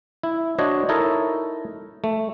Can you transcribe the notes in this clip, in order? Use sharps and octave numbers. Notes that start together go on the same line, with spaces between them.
E4
D4 F#4 C5 C#5 D#5
D#4 E4 A4 A#4 C#5 D#5
A3